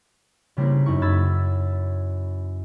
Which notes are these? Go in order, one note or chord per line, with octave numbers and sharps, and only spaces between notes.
C#3 G3 A#3 C4 E4 A#4
F#2 D#4 E4 C#6
B5 E6 G#6 A6